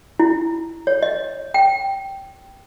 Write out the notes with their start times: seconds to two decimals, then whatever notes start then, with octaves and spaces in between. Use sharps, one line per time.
0.19 E4
0.87 C#5
1.03 D#5
1.54 G5